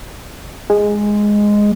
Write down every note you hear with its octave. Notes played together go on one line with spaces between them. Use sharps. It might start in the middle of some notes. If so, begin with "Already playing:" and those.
G#3